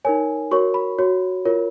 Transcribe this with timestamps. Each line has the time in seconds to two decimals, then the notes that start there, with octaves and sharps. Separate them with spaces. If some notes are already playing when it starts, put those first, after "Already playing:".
0.05 D#4 A#4 C#5 G#5
0.51 F#4 A#4 C#5 C#6
0.74 B5
0.99 F#4 C#5
1.45 F4 A#4 C#5